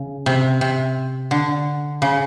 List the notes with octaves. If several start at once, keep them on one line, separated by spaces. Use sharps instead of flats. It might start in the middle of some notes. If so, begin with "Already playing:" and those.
Already playing: C#3
C3
C3
D3
C#3